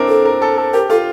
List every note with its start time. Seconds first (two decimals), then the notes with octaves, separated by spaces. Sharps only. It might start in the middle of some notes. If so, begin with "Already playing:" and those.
Already playing: C4 D4 E4 A#4
0.09 A4
0.25 A#4
0.42 A4
0.57 A4
0.73 G4 A#4
0.90 F4 A4